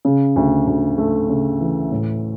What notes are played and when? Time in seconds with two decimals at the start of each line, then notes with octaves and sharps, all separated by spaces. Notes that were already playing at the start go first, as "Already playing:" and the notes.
0.05 C#3
0.36 D2
0.67 D2
0.98 A3
1.29 C#3
1.60 E3
1.91 A2